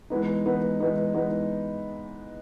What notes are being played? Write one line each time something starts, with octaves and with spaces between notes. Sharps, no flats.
E3 G#3 B3 D#4
E3 G#3 B3 D#4
E3 G#3 B3 D#4
E3 G#3 B3 D#4